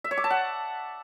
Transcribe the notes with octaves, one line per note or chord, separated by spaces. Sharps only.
E5
C#5
D6
A5
F#5